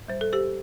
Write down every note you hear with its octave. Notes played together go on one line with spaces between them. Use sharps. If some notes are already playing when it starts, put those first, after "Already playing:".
Already playing: A2
G3 C5
A4
G4 C5